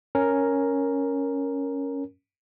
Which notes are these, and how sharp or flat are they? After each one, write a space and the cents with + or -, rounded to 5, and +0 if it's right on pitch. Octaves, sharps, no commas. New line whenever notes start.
C#4 +0 A#4 +0